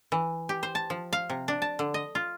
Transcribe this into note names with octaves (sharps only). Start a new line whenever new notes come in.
E3
G4
C5
A5
F3
F5
C3
D4
A5
D3
D#5
F4